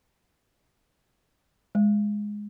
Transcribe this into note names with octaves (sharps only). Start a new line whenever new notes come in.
G#3